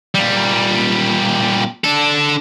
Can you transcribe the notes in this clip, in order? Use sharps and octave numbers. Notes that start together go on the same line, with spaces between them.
A#2 G3
D4 A4